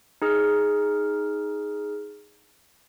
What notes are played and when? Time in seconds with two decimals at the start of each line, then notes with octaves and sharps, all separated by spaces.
0.22 D#4 G#4 F6